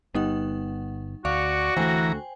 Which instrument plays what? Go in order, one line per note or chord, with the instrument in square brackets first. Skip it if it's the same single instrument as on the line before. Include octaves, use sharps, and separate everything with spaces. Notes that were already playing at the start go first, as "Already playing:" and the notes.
[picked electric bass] G1 B3 [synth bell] G3 D#4 F#5
[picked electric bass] D2 [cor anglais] F#4 [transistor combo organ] D5 C#6 [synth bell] F5
[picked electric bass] D2 A3 [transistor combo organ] E3 A#5 [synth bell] C5 G5 G#5